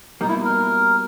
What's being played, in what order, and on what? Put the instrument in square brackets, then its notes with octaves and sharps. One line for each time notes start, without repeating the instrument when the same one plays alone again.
[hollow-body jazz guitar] B2 G3 A#3 [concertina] D#4
[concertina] E4
A#4